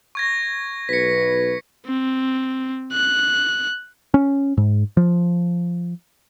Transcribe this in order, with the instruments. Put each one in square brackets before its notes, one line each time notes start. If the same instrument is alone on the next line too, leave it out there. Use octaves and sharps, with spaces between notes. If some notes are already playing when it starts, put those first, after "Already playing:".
[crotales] C#6 G#6 A#6
[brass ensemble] B1 B4 [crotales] B6 C#7
[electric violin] C4
F#6
[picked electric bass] C#4
G#2
F3